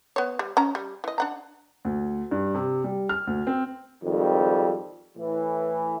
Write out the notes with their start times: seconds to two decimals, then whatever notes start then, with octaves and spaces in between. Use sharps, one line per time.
0.16 B3 C#5
0.39 G3
0.57 C#4 A#5
0.75 G3
1.04 E3 D#5
1.18 D4 F#5 A#5
1.85 D2
2.31 G2
2.55 C3
2.84 G3
3.09 F6
3.27 D2
3.47 C4
4.03 G#1 F2 D#3 G3
5.17 A2 E3